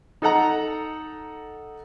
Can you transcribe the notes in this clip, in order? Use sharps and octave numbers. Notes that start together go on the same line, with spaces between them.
D#4 A4 F#5 A#5